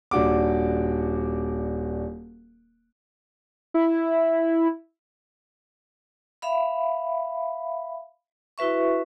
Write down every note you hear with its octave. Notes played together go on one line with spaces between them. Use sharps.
D#1 D4 F#4 D6
E4
E5 F5 B5
E4 F#4 B4 E5 C#6